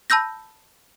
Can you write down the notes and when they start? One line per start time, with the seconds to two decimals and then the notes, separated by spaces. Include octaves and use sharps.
0.10 A5 B5 E6 G6 A#6